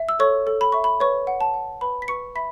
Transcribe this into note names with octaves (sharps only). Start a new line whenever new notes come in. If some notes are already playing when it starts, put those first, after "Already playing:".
Already playing: E5
E6
A4 C#5 C#6
A4
B5
E5 C#6
B5
B4 C#5 C#6
F#5
A5
F#5
B4 B5
B6
B4 C#6 C#7
E5 B5 B6